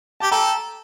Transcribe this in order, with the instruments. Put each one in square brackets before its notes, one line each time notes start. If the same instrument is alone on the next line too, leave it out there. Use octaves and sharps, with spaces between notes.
[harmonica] G4 [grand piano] A5
[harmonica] A4 [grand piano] G5 A#5